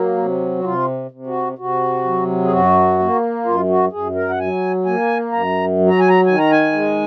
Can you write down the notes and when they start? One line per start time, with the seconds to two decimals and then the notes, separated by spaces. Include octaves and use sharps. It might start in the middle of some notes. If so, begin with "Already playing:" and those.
Already playing: F#3 A#3
0.17 C3
0.59 F#4
0.64 C3 F4
1.11 C3
1.27 F#4
1.58 C3 F#4
2.04 F#3
2.44 G#4
2.52 F#2 F#4
2.99 A#3
3.45 F#2 F4
3.69 F#4
3.92 F#2 G#4
4.15 A#4
4.29 F#5
4.39 F#3 G#5
4.85 A#3 G#5
5.32 F#2 A#5
5.79 F#3
5.90 A#5
5.99 G#5
6.09 A#5
6.26 D#3 G#5
6.39 A#5
6.51 G#5
6.72 G#3